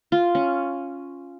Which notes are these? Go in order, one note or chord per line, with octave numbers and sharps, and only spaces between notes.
F4
C#4